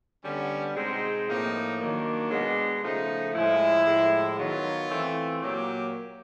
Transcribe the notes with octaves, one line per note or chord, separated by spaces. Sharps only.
D3 G3 B3 C#4
B2 G#3 C4 D#4
A2 F3 A#3 D#4
D#3 F#3 A#3 D4
B2 G#3 B3
C#3 F3 A3 D#4
A2 F3 G#3 E4
A2 F3 G#3
D#3 F#3 B3 F4
E3 A3 C4
A#2 F#3 A#3 G4